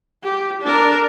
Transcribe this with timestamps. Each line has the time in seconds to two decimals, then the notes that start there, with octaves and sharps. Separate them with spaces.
0.24 G4
0.62 D4 A#4